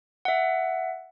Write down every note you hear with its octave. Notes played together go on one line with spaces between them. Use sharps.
E5 F#5